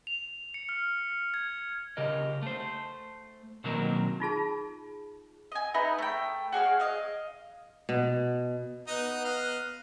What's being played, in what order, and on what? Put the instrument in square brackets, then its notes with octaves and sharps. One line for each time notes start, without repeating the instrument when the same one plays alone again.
[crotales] F7
C#7
F6
G#6
[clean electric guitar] C#3 G4 A#4 D#5
A3 C5
B2 D#3 F#3 A#3 C4 A#4
[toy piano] D#4 F4 G#4 A5
[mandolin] D#5 G#5
D#4 E4 B4 A#5
A3 G5
F#4 G#4 D5 F5
D#5 F5
[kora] B2
[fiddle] B3 F#6 [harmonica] D#4 D#5
[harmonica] D#5 F5